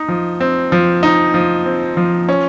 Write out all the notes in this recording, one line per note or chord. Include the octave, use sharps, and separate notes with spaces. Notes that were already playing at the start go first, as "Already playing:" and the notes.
Already playing: D#4
F3
C4
F3
D#4
F3
C4
F3
C#4